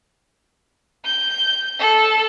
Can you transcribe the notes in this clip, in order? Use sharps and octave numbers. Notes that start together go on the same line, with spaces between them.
G6
A4